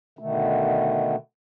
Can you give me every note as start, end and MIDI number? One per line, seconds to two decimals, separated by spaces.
0.19 1.16 47
0.19 1.16 50
0.19 1.16 51
0.19 1.16 57